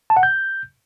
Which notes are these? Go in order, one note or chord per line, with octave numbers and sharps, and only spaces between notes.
A5
F#5
G6